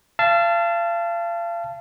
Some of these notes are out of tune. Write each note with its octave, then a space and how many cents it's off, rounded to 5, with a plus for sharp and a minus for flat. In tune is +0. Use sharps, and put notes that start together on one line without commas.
F5 -35 A5 +0